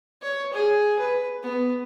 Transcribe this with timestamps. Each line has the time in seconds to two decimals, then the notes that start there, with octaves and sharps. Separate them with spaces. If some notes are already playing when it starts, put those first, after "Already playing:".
0.23 C#5
0.53 G#4
0.99 B4
1.43 B3